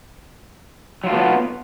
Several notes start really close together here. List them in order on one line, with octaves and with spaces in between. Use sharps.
F#3 F4 A3 B3